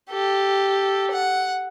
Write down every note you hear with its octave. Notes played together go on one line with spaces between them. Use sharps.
G4 A4
F#5